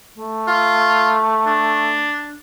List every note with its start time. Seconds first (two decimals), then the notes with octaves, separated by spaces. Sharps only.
0.17 A3
0.48 F4
1.46 D4